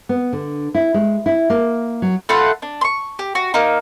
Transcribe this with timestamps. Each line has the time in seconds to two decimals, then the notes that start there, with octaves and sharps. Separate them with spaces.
0.09 B3
0.33 D3
0.75 E4
0.94 G#3
1.26 E4
1.50 A#3
2.02 F#3
2.29 A3 F4 F#5 B5
2.62 D4
2.81 C6 C#6
3.19 G4
3.35 F#4
3.54 A#3 D#4